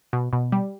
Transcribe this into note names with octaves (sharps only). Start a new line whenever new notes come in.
B2
B2
G3